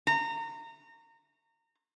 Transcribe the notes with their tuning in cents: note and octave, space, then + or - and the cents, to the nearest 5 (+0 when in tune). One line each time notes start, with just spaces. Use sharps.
A#5 -25